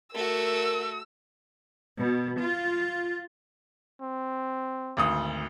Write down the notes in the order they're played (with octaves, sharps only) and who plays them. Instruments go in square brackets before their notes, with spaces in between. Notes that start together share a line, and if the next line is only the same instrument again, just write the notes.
[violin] A3 F#4 [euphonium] A#4 [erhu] E6
[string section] B2
F4
[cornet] C4
[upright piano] G#1 D2 D#6